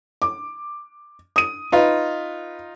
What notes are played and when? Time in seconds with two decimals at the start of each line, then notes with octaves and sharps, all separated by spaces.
0.22 D6
1.36 D#6 D#7
1.72 D#4 F4 B4